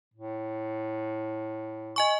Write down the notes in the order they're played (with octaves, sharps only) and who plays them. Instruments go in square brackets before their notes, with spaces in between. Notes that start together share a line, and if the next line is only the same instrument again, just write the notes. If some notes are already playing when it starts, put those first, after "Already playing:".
[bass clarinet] A2
[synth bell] D#5 G#5 C#6